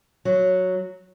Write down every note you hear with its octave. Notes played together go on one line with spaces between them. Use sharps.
F#3